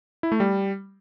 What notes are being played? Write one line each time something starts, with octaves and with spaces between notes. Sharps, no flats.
E4
A3
G3